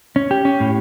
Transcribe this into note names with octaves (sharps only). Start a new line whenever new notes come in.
C#4
G4
C#4
A2